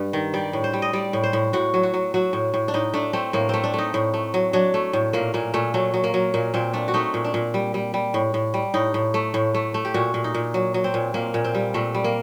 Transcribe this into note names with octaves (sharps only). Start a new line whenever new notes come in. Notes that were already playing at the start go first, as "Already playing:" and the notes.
Already playing: G2 D5
D#3
G3 D5
A2
C5
G3
D#5
G3 D5
A2
C5
A2
A2 F#4
F#3
F#4
F#3
F#3 F#4
A2
A2
D4
A2 D#4
A3 D4
A3 C4
A2 A#3
A3 C4
D4
A3 D#4
A2
A3
F#3
F#3 D4
A3
A2
A#2 A#3
A#2 A#3
A#2 A3
F#3 A3
F#3
A#3
F#3
A#2 A#3
A#2 C4
A3 D4
F#4
A3 D#4
A#2
D4
A#2
G3
G3
G3
A2
A2
G3
A2 D#4
A2
A3
A2
A3
A3
G4
A#2 F#4
A#2
D#4
A#2
F#3
F#3
C4
A#2
A#2 A#3
A#2
C4
G3
A#2 A3
G3
A#3